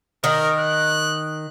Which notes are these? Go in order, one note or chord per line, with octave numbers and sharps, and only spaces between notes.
D#3 A#4
F#6